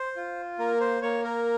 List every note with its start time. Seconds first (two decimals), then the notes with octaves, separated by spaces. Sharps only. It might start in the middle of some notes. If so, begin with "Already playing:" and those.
Already playing: C5
0.16 F4
0.59 A#3 A#4
0.80 C5
1.02 A#3 C#5
1.24 A#4